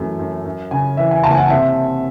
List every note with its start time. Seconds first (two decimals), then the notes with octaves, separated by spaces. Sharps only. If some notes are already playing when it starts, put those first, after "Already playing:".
Already playing: F#2 E3 A3
0.19 F#2
0.45 F#2
0.71 C#3 G#5
0.97 E3 E5
1.11 G#5
1.24 F#1 A5
1.31 G#5
1.37 F#5
1.50 C3 E5